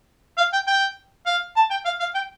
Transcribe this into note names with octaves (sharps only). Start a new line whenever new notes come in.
F5
G5
G5
F5
A5
G5
F5
F5
G5